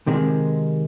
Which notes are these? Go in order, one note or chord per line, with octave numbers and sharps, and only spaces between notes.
C3 D#3 G#3